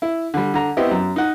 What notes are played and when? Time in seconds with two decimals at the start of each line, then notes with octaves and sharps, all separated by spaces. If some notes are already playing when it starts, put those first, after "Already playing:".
0.02 E4
0.34 D3 G3
0.54 D3 A#5
0.77 B3 C4 E4 G4 D#5
0.91 F#2
1.16 D#4 F#5